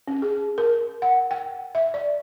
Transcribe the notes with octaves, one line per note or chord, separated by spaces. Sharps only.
C#4
G#4
A#4
F#5
G5
E5
D5